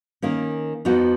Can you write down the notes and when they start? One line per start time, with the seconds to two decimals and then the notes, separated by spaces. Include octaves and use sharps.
0.22 D#3 A#3 C#4
0.85 F2 F3 B3 D#4 F#4